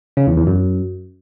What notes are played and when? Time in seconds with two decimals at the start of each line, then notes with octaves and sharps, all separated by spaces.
0.17 C#3
0.27 E2
0.37 E2
0.47 F#2